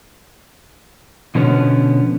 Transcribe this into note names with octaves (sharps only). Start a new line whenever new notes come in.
B2 D3 F3 B3 C#4